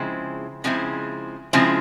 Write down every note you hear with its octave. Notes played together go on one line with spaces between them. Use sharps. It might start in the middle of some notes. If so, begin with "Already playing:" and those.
Already playing: C#3 F3 G#3 C4 E4
C#3 F3 G#3 C4 E4
C#3 F3 G#3 C4 E4